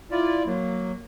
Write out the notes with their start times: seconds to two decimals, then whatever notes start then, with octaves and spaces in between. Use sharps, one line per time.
0.11 E4 F4 D5
0.46 F#3 A#3